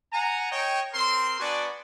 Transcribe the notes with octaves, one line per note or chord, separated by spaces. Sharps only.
F#5 G#5 A#5
C#5 D#5 G5
C4 A#4 C6
B3 D4 F#4 D5 G#5